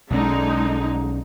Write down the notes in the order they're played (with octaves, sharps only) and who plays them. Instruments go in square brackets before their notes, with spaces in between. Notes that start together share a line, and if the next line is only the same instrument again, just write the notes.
[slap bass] B1 F#3 C#4 [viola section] D3 G#3 D#4